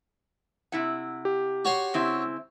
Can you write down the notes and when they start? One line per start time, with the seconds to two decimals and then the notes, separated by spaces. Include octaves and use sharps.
0.72 C3 E4 F#5
1.25 G4
1.65 F#4 C#5 C6
1.94 C#3 C4 E4